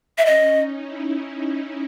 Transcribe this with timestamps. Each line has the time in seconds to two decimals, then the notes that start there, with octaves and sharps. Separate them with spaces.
0.18 E5
0.26 C#4 D#5
0.55 D#4
0.83 E4